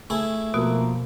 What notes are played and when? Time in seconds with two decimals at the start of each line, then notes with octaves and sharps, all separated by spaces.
0.10 A3 E4 G#4
0.54 B2 F3 A#3 B3 F#4